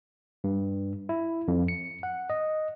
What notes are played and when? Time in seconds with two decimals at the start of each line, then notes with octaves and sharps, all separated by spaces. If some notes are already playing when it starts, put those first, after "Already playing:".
0.44 G2
1.09 E4
1.48 F2
1.68 C#7
2.03 F#5
2.30 D#5